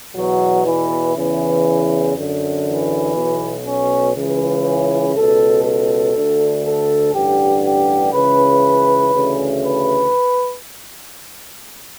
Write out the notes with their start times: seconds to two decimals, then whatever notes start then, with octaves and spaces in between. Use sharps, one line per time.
0.15 E2 B2 F#3
0.66 E3
1.16 E2 C#3 E3
2.15 F#2 D3
2.65 E3
3.15 B1 B2
3.65 C#4
4.15 C#2 C#3 E3
5.14 C#2 B2 A4
5.64 A4
6.14 D2 D3
6.64 A4
7.14 A1 G2 D3 G4
7.64 G4
8.13 C#2 C#3 E3 B4
9.13 D2 C#3 E3
9.63 B4